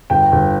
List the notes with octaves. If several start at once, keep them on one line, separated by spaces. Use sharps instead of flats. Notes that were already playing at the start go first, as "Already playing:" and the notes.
G1 G5
G1